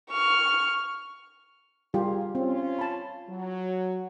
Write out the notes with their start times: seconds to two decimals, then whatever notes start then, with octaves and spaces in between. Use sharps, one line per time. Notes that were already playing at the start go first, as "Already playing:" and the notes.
0.11 C#6 F6
1.94 G3 F4 G4 G#4 A#4
2.35 C4 C#4 F4
2.79 A5 B5
3.29 F#3